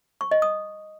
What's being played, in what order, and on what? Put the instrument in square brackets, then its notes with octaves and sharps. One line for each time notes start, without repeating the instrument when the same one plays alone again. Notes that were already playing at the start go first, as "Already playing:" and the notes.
[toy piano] C#6
D#5
D#6